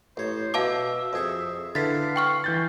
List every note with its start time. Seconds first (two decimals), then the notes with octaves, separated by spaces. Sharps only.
0.17 A1 C5 C#5
0.54 B2 E5 F5 A5 D6
1.13 F2 G#4 C#6
1.75 D3 E4 B4 F5 A6 B6
2.16 G5 C#6 F6
2.44 E3 C#4 G6 A6